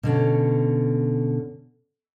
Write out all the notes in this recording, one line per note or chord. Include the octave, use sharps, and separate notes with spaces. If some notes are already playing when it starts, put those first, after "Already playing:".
B2 D3 C#4